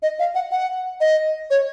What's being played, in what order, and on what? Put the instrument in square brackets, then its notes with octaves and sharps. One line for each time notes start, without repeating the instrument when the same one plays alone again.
[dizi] D#5
F5
F#5
F#5
D#5
C#5